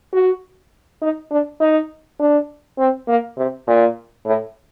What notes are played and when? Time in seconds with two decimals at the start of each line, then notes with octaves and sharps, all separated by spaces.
0.13 F#4
1.02 D#4
1.31 D4
1.60 D#4
2.20 D4
2.79 C4
3.08 A#3
3.37 C3
3.67 A#2
4.26 A2